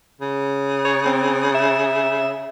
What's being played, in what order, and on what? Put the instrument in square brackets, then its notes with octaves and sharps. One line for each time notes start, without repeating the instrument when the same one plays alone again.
[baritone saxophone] C#3
[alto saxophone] C#5
C4
E5